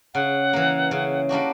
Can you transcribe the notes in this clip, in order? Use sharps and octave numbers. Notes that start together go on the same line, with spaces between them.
C#3 F#5
E3 A#3
C#3
G3 A#3 D4 F#4